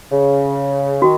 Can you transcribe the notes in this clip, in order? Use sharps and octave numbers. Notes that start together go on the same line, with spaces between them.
C#3
D#3 F#4